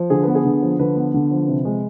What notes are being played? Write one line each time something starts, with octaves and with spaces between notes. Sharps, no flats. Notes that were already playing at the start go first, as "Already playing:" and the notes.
Already playing: F3
D3 G#4
B3 B4
G#4
D3
F3
D3 B4
B3
D3
F3
C3
G#3